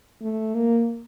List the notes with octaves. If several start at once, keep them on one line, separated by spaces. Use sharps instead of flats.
A3
A#3